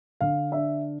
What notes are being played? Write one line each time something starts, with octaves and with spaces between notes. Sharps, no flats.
D3 F5
D4 E5